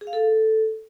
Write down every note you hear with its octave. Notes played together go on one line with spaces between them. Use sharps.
G#4
F5
A4